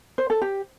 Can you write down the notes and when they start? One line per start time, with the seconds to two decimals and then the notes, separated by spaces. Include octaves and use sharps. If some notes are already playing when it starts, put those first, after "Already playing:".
0.18 C5
0.30 A4
0.42 G4